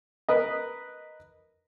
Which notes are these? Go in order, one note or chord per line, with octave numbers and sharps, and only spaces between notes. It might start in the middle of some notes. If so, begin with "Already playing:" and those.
A#4 B4 D#5